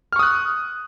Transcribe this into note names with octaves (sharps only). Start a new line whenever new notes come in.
C#6 D#6 F6 F#6